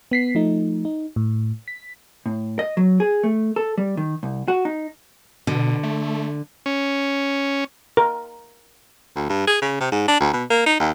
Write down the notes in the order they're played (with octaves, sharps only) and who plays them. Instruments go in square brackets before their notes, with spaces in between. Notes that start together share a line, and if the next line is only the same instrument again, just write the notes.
[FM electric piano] B3 B6 C7
F3 A3 D#4
D#4
A2
B6
[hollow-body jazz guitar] A2
D#5
F#3
G#4
A3
A4
G3
D#3
C2
F#4
D#4
[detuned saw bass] B2 [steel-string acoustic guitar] D3
[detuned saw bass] A3
[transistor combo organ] C#4
[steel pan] A#4
[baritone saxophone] D2
G2
G#4
C#3
C3
G#2
D4
D2
B2
A#3
D#4
D#2